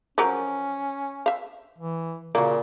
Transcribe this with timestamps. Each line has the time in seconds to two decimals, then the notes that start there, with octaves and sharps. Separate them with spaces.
0.18 F3 F#3 C#4 A#4
1.26 E5 F5
1.78 E3
2.35 A#2 C#3 A#3 F#4